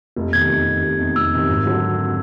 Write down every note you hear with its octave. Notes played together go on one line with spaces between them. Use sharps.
F1
E2 C3 D#3 G#6
F1
E2 C3 D#3
F1
E2 C3 D#3
F1 E6
E2 C3 D#3
G#1
D3 F#3